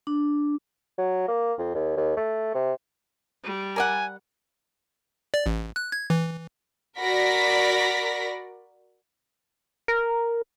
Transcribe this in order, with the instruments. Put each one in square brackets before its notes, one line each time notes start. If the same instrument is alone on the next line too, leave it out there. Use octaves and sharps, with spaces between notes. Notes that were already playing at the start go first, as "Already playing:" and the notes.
[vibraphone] D4
[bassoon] F#3
A#3
F2
D#2
D#2
A3
C3
[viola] G3
[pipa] A#4 D5 F#5 [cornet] G#5
[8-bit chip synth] D5
A1
F#6
G#6
E3
[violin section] F#4 A#4 D5 B5 A#6 B6
[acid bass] A#4